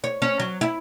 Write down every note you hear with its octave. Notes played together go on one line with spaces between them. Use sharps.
C#5
C#4
F#3
E4